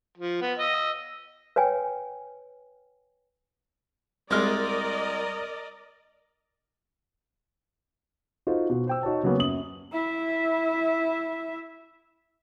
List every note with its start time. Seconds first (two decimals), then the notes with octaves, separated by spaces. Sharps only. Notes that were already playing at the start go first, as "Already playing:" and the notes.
0.18 F3
0.41 B3
0.59 D#5 E6
1.56 B4 C#5 G5 G#5
4.31 C2 G#3 C4 A#4 D5 D#5 F6
8.47 D#4 F4 F#4 A4 C5
8.70 B2 F#4
8.87 C5 G5 E6
9.03 D#4 F#4 C#5 A5
9.23 C#3 F#3 A#3 B3 C#4
9.39 F#2 D#6 F#7
9.92 E4 E5